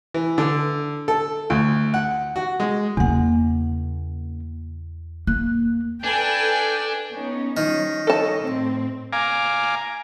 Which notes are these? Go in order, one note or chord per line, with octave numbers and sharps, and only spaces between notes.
E3
D3
A4
D2
F#5
F#4
G#3
E2 C#3 A#3 F#5
A#3 F#6
D4 A4 B4 G5 G#5
B3 C#4 D#4
D#3 F3 G3 C#4
A4 C#5 D#5 A5
A2 C4
F5 G#5 A#5 D6